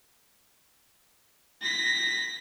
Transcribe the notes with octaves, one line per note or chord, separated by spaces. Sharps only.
A#6 B6